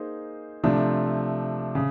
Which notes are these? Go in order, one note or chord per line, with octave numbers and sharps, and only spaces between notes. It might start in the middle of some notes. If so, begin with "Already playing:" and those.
Already playing: A#3 D#4 G#4 C5
C3 F3 A3 D4
C#3